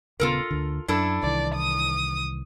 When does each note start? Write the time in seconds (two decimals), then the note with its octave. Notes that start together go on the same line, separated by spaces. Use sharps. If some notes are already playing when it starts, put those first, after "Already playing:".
0.20 D#1 C#3 B3 F4 A4 A#4
0.51 D2 D3
0.88 F#2 D4 E4 A4
1.23 C2 D#3 E3 D5
1.56 D#6